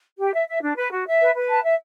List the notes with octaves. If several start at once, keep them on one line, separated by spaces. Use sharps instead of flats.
G4
E5
E5
D4
B4
F#4
E5
B4
B4
A5
E5